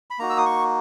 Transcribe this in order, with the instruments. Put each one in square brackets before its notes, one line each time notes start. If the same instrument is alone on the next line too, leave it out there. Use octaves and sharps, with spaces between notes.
[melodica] B5
A#3 D#4 F#4 A#5
E6
D#6
C#6